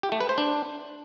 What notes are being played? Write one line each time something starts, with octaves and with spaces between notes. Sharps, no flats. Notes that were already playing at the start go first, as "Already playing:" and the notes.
G4
A3
B4
C5
D4